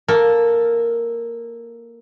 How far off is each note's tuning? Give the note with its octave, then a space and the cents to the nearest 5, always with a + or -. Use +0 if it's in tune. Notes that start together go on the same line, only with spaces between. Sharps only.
A#3 +0 A4 +0